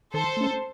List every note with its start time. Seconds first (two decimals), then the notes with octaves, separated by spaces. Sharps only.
0.13 D#3 A4 C5
0.37 A3 C#4